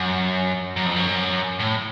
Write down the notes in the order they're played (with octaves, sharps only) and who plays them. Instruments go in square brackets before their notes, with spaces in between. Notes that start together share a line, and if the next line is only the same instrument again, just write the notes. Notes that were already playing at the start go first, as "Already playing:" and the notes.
Already playing: [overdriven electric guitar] F#2
F#2
F2
F#2
A2